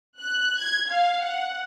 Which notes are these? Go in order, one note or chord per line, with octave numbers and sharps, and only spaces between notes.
F#6
G#6
F5
F#5